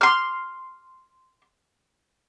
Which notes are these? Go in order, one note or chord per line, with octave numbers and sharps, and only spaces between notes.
C6 F6